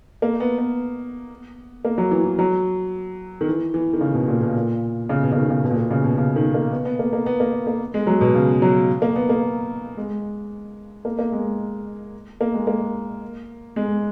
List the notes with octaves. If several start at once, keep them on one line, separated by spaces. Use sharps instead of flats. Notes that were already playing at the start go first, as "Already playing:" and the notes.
A#3
B3
B3
A#3
F#3
E3
E3
F#3
D#3
E3
E3
D#3
C#3
B2
A#2
B2
A#2
C#3
B2
C#3
D#3
C#3
B2
A#2
B2
C#3
B2
C#3
D#3
A#3
B3
B3
A#3
A#3
B3
A#3
A#3
G#3
F#3
B2
C#3
F#3
A#3
B3
A#3
G#3
A#3
A#3
G#3
A#3
G#3
A#3
G#3